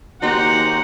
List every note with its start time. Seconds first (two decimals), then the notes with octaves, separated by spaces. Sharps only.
0.22 D#2 G#3 A#3 D#4 F#4 G4 C5 F#5